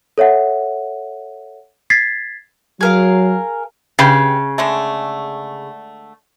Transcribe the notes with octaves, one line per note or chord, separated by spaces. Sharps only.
A4 C#5 E5 F#5
G#6 A6 B6 C7
F#3 G#4 A#4 F5
C#3 G4 B4 G5
D3 G#3 A3